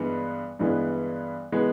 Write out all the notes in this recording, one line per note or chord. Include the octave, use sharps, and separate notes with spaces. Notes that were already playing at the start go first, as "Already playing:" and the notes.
Already playing: G2 E3 G#3 B3
G2 E3 G#3 B3
E3 G#3 B3